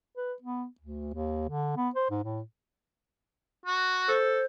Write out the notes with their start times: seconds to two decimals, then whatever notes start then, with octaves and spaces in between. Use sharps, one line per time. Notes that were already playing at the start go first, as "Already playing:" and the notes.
0.17 B4
0.42 B3
0.80 D2
1.14 D#2
1.49 D3
1.77 B3
1.95 C5
2.10 G#2
2.24 A2
3.66 F#4
4.08 A4 C5